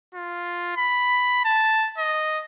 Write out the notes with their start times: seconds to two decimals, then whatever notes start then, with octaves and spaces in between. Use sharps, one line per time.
0.15 F4
0.77 B5
1.45 A5
1.98 D#5